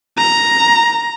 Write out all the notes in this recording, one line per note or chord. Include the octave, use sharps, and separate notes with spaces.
A#5